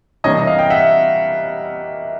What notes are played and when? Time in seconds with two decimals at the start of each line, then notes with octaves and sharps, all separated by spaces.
0.24 C3 E3 G3 A#3 D4 C#5 D#5
0.47 D#5 F5
0.59 G5
0.70 E5 F#5